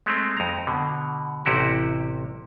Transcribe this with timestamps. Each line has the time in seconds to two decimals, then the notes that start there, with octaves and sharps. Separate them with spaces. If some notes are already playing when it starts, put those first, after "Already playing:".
0.06 G#3 A3 C4
0.37 F2 A#5
0.67 B2 D3
1.45 A1 C3 E4 F#4 G4